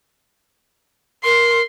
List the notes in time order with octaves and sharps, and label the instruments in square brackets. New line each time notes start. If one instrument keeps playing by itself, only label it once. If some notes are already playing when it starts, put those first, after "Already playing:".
[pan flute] A#4 [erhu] C6